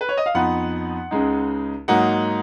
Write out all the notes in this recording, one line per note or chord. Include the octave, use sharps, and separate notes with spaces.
B4
C#5
D#5
F5
F2 F3 B3 D#4 F#5
C#2 C#3 G#3 D#4
G#2 F#3 A#3 D#4 F#5